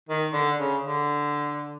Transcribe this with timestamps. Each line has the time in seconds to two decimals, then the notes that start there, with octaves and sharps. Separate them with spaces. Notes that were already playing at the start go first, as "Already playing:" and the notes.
0.09 D#3
0.33 D3
0.58 C#3
0.83 D3